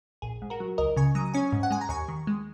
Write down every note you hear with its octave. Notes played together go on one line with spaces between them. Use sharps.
A#1 G#4
G#2
F#4 A#4
F#3
C#2 A#4 D#5
C#3 G#5 C#6
F#3 A#5 D#6
D#6
C#4 G#5 C#6
G#2
F#5
G#3 G#5
A#5
D#2 G#5 C#6
D#3
G#3